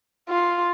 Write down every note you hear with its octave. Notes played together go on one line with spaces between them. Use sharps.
F4